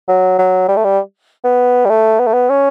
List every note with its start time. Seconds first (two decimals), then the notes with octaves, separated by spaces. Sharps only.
0.08 F#3
0.39 F#3
0.68 G3
0.76 A3
0.84 G3
1.44 B3
1.85 G3
1.90 A3
2.19 B3
2.27 A3
2.34 B3
2.50 C#4